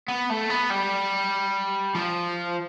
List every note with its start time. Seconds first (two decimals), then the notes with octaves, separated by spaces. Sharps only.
0.08 B3
0.30 A3
0.50 B3
0.70 G3
1.95 F3